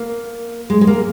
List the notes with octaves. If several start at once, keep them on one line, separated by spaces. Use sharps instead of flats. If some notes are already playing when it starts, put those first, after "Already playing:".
Already playing: A#3
G#3
G#3
A#3